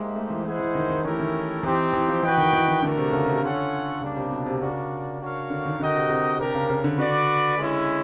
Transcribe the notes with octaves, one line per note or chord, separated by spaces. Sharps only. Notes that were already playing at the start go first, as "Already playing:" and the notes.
Already playing: G#3 A#3 D#4 G4 C5 E5
A3
E3
E3 E4 G#4 C5 D#5 F#5
E3
D#3
D#3
E3 A3 C#4 E4 G4 A#4
D#3
E3 C4 D#4 G4
E3
F3
E3 F#4 B4 D#5 G5
D#3
E3
D#3
D3 A3 D4 F#4 A#4
C3
C#3
C3
D3 C#4 F4 A4 C#5 F#5
C#3 G3 A#3 D4
C3
B2
C3
C#3 D4 F#4 A#4 D5
D4 F#4 A#4 C#5 F5
D3
D#3
D3 F#4 A#4 D#5 G5
C3
C3
C3 D4 G4 A#4
C#3
C#3
D3
D3 F#4 B4 D5
G#3 C#4 E4